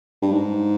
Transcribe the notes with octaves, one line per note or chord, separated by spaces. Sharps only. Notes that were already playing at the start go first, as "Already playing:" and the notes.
G2
G#2